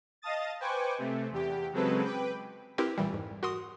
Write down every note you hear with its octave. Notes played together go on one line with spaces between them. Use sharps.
D#5 F5 A5 D#6 A6
B4 C5 G5 G#5 C#6 D6
C3 A3
E2 G4
C#3 F#3 G#3 C4 A4 B4
B4 G5 D6
C4 E4 G4 A#4 B4
G#1 A#2 E3 G3
F2 G#2
F#4 A#4 C6 D#6